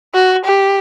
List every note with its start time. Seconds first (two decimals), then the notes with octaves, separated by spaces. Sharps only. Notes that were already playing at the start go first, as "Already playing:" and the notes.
0.14 F#4
0.45 G4